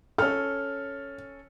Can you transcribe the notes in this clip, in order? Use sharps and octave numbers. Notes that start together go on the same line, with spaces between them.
C#4 A4 F6